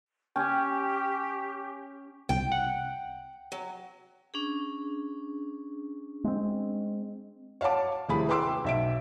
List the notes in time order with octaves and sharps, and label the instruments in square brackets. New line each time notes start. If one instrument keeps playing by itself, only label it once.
[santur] C#4 [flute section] G4 [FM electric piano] G5 G#5
[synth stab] C2 [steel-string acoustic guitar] G5
[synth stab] F#5
[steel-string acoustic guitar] F#3
[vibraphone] C#4 D4 G#4
[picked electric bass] G#3 C4
[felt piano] C#5 F5 F#5 A5 D6
D#1 C3 A3 E4 G#4 B5
B4 G5 C6 D6 E6
B1 E5 D7